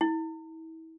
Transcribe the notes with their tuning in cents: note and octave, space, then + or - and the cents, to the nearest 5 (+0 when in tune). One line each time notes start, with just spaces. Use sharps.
E4 -35